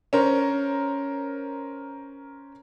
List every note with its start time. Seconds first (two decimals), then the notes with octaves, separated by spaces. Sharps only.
0.13 C#4 A#4 C5